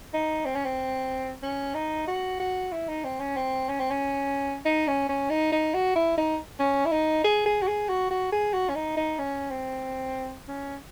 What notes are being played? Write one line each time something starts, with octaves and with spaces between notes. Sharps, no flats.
D#4
C4
C#4
C4
C#4
D#4
F#4
F#4
E4
D#4
C4
C#4
C4
C#4
C4
C#4
D#4
C#4
C#4
D#4
D#4
F#4
E4
D#4
C#4
E4
D#4
G#4
G#4
F#4
G#4
F#4
F#4
G#4
F#4
C#4
D#4
D#4
C#4
C4
C#4